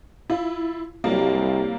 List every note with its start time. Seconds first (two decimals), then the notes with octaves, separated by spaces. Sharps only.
0.30 E4 F4
1.04 C2 F#3 G3 A#3